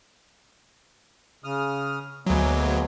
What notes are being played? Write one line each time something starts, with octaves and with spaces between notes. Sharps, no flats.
C#3 D#6 F6
D2 F#3 G#3 A#3 B3